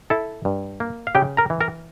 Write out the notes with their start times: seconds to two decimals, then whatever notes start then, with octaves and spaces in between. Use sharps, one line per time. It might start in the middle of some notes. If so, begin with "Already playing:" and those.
0.10 E4 A4 A5
0.45 G2
0.80 A#3
1.07 F5
1.15 C#3 G4 G5
1.37 A#4 A#5
1.50 E3
1.61 A#4 A#5